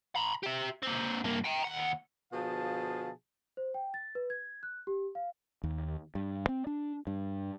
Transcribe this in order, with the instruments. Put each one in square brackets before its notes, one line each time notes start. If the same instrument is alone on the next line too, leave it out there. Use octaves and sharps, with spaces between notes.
[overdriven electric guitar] A#5 B5
G4 E5
A#3 C4
G2 A#3
G5 A#5
D#2 F#5
[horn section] B2 D3 F3 G#4 F5 A5
[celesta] C5
G5
A6
B4
G#6
F#6
G4
F5
[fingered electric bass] D#2
G2
C4
D4
G2